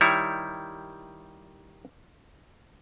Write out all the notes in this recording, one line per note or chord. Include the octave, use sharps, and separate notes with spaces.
D#3 G3 E4 C#5